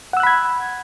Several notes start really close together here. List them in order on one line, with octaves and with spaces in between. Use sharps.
F#5 E6 F#6 B5 G#6